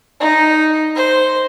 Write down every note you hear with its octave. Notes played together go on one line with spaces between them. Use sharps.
D#4
C5